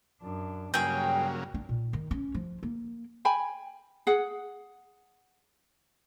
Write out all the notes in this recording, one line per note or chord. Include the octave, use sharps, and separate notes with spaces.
F#2 D4
G2 C#3 F#3 G3 A#3 G#4 G5
D4
A#2
D#3
C#4
F3
A#3
G5 G#5 B5
G#4 F#5